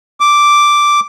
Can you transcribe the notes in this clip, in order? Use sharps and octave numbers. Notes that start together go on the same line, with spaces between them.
D6